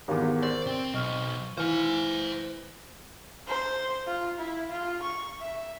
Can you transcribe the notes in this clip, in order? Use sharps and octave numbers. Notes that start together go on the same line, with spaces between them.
G#1 E2 G4 A#4 F5
A#4 C5 D5 C#6 E6
C4 G5
B1 D#5 C#6 F6
E3 C5 F5 G#5 F6
C5
F4
E4
F4
C#6
E5